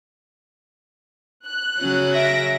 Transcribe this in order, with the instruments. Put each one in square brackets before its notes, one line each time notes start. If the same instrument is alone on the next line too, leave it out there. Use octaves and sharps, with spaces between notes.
[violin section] F#6
[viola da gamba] C#3 F#3 C#4
[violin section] E5 A#6 D7